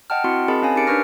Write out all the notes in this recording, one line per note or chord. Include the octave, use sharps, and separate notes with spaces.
D#5 F#5 G5 A5 F6
C4 E4 F#4 C6 C#7
C4 G#4 A#4 D#5 A5 B5
C#4 F5 G#5
D#4 G4 A#4 A6 C#7 D7
D4 B4 C#6 F6 A#6